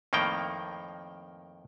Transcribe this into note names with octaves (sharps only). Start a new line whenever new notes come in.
F2 A2 D#3 A#3 G5